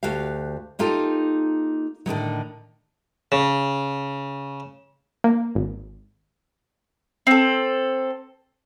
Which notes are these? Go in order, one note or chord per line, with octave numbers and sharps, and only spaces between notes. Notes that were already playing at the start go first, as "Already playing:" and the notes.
D2 F#4 G4 F5
A#3 D#4 F4 G4 A4
A2 D3 D#3 F#3
C#3
A#3
G#1
C4 A4